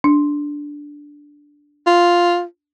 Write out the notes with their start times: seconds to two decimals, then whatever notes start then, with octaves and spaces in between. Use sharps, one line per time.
0.04 D4
1.87 F4